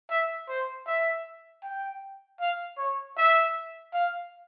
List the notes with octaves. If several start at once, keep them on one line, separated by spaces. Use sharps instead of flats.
E5
C5
E5
G5
F5
C#5
E5
F5